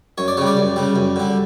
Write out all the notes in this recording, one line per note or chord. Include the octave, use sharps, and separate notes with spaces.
F#2 C#5
D5
C#3 G3 C#5
D5
F#2
C#3 G3
F#2
D3 G3